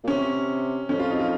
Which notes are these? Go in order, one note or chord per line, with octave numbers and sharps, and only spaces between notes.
A#2
C3 C#4
F2 C#4
F4
D#4
F4